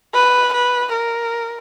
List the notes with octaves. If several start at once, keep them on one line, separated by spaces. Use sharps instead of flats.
B4
B4
A#4